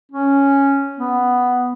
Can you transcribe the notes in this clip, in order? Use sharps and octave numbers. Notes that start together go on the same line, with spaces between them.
C#4
B3